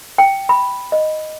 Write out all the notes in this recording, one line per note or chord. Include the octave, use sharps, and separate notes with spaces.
G5
B5
D#5